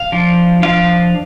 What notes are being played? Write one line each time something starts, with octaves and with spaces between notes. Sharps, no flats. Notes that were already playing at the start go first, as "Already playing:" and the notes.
Already playing: F5
F3 D4 F4
F3 D4 F4 F5